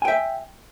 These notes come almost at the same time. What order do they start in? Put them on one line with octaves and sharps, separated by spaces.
G#5 G5 E5